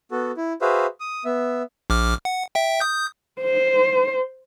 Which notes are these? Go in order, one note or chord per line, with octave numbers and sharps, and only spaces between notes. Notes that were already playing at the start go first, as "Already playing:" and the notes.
B3 F#4 A4
E4
F#4 G#4 B4 C5 E5 F5
D#6
B3 E5
A#1 D6 F6
F#5
E5 G5
D#6 G6
C5